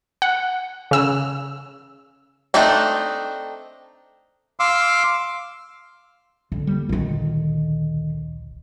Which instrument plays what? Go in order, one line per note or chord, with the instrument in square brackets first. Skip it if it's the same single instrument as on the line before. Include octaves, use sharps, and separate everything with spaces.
[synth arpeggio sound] F#5
C#3 E6
[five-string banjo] A3 C4 D4 D#4
[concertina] F5 C6 D6 E6
[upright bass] D3
[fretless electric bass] G3 A#3
[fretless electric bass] D1 A#1 [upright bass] D3 D#3